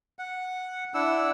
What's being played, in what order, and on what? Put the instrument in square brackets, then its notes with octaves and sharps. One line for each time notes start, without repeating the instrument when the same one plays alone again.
[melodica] F#5
D4 E4 F#5 E6